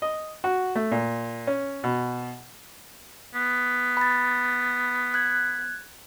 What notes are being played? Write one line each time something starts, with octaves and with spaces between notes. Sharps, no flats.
D#5
F#4
A3
A#2
C#4
B2
B3
B5 A6
F#6 G#6